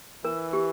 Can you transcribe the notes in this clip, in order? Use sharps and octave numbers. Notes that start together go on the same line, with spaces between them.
E3 A#4
G4